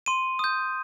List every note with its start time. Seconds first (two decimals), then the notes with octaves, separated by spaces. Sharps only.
0.06 C6 D#7
0.39 D#6 G6